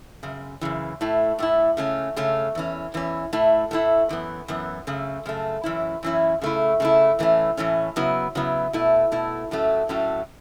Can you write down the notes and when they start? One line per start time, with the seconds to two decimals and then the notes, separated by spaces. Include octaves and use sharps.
0.23 F#2 C#3
0.61 F#2 C#3 E3
1.01 A2 A3 E4
1.39 A2 A3 E4
1.77 C#3 A3 C#4
2.16 C#3 A3 C#4
2.55 E2 E3 C#4
2.94 E2 E3 C#4
3.33 A2 A3 E4
3.71 A2 A3 E4
4.09 F#2 E3 B3
4.48 F#2 E3 B3
4.87 F#2 C#3 A3
5.26 F#2 C#3 A3
5.64 F#2 E3 C#4 E4
6.03 F#2 E3 C#4 E4
6.42 C#3 A3 E4
6.80 C#3 A3 E4
7.19 A2 E3 A3 C#4
7.57 A2 E3 A3 C#4
7.96 C#3 F#3 B3 E4
8.35 C#3 F#3 B3 E4
8.73 B2 A3 E4
9.12 B2 A3 E4
9.51 A2 F#3 A3 C#4
9.89 A2 F#3 A3 C#4